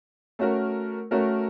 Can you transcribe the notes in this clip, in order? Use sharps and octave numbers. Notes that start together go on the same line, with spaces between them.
A3 C#4 F#4 A#4
A3 C#4 F#4 A#4